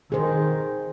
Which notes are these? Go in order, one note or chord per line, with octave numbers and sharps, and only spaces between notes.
D#3 G#4 C5